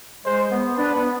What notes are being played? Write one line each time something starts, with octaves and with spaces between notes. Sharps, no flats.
G#3 C5
B3
D4 B4
B3